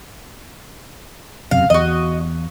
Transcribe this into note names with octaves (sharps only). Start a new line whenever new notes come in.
E1 F#2 C3 F5
E2 F#4 D#5